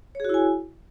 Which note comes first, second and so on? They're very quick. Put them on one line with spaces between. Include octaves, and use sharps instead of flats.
C#5 G#4 F#4 E4 G#5